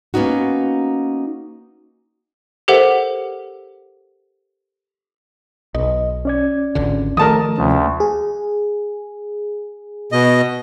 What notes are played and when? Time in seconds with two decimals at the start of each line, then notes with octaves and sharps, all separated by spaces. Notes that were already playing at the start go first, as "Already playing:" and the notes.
0.14 A#3 B3 C#4 D#4 F#4
2.68 G4 A4 A#4 C5 E5 F#5
5.75 B1 D#5
6.25 C#4 D5 G#6
6.75 G#1 C#2 D3
7.17 D#3 F3 A3 A#4 A5 D#6
7.58 D2 C3 F3 C#4
8.00 G#4
10.12 B2 D#5